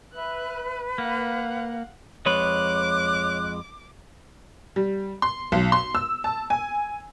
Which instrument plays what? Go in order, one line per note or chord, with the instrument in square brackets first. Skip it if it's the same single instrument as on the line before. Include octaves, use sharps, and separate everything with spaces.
[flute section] B4 [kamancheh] E5 F#6
[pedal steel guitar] A#3 [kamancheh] F5 F#5
[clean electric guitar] F2 G#3 B4 [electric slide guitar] C#5 [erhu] D6 [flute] F#6
[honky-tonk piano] G3
C6
B1
C6
E6
A5
G#5